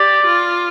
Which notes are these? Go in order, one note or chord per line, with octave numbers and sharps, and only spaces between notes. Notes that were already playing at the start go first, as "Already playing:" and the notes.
Already playing: G4 D5
F4